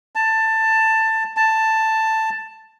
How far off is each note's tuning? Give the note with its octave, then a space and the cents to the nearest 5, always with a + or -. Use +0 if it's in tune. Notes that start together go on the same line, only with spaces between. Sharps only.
A5 +15
A5 +10